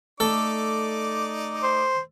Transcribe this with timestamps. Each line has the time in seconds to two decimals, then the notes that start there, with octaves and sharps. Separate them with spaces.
0.20 A3 D#4 A4 D5 D6
1.63 C5